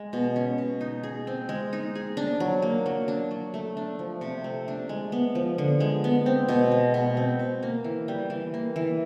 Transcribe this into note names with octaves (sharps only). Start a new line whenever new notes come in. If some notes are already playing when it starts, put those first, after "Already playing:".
Already playing: G#3
B2
C#4
B2
D#4
G#4
C4
G#3
D#4
G#4
D4
F#3
A#3
F#3
D4
F#3
A3
D4
F3
C3
A3
D4
G#3
B3
F3
D3
G#3
B3
C4
B2
G#3
B2
C4
B2
A#3
E3
G3
E3
A#3
E3